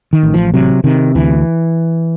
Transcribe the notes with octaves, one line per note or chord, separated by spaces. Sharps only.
D#3
A1
F3
C3 F#3
C3 D#3
D2 E3